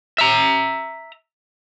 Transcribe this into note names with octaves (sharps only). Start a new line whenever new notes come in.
E5 A#5